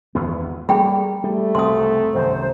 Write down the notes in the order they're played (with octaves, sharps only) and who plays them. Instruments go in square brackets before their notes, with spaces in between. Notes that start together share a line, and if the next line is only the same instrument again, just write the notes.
[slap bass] G#1 E2 B3
[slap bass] G3 A3 A#3 [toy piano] G#4 G5 B5
[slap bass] G3 [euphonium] A3
[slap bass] F#1 C2 C4 [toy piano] C6 D#6
[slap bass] C2 F#2 D#3 [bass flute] C5